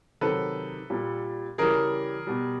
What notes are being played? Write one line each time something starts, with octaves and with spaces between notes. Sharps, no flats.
C3 D#3 F#3 A4 B4
A#2 G3
C#3 E3 G3 G#4 A#4
B2 G3